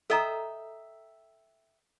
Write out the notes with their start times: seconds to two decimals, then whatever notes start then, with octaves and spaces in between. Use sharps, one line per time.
0.10 A4 D#5 E5 G5 A#5 D#6